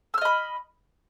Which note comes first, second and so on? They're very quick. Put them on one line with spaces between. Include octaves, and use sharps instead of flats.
E6 F6 D#5 B5